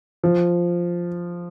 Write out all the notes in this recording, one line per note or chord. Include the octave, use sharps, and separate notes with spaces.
F3